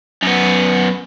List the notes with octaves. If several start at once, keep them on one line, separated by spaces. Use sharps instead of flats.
F#2 B3